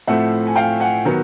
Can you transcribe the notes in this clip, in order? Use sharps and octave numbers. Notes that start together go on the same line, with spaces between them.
A2 F3 A3 C4 E5 F#5
G#5
F5 G5
F#5 G#5
D#3 F#3 B3